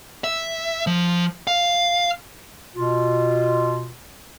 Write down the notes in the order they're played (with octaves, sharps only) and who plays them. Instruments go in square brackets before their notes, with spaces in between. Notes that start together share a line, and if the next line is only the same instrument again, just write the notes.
[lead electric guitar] E5
F3
F5
[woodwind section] B2 F4